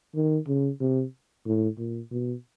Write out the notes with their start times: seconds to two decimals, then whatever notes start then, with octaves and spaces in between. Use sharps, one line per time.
0.15 D#3
0.47 C#3
0.80 C3
1.46 A2
1.78 A#2
2.11 B2